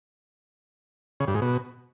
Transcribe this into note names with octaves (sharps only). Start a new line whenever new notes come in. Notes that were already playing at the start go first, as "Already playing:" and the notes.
C#3
G2
G#2
B2